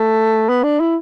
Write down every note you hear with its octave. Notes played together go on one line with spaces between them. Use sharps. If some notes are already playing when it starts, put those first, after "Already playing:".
Already playing: A3
B3
D4
E4